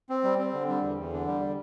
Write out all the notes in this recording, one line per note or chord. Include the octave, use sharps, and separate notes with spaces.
C4
G3
C4
D3
G3
E2
E2
D3
G3